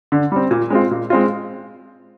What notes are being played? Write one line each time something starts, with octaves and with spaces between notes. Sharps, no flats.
D3
G3 C4
A#2
G#3 C4 F4
A#2
G#3 C4 F4